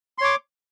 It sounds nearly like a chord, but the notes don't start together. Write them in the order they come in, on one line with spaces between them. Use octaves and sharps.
C6 C#5 D6